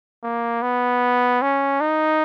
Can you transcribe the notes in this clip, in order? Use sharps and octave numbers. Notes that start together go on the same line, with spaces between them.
A#3
B3
C#4
D#4